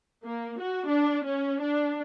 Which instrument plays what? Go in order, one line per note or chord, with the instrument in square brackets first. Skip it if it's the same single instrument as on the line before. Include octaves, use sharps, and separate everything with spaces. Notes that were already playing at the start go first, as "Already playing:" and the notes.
[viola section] A#3
F#4
D4
C#4
D4